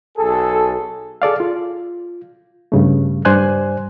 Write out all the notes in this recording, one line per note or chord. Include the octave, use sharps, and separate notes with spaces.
B1 G#4 A4
G#4 A4 D5 F5
F4
G2 C#3 A3
G2 C5 D5 G#5 F#6